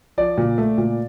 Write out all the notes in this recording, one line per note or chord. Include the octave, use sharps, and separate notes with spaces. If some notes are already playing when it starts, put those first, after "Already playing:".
F3 D5
A#2
A3
A#2